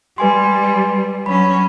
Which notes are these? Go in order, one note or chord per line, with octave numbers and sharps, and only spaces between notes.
G3 B4 G#5 C6
F#3 C#4 B5